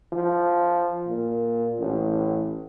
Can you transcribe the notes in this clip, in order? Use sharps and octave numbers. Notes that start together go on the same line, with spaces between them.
F3
A#2
A1